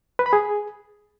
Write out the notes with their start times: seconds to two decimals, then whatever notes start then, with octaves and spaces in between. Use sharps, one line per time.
0.19 B4
0.26 B5
0.33 G#4